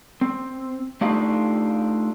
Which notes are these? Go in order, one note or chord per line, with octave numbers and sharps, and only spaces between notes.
C4
A3 D4 D#4 F4 G4 F5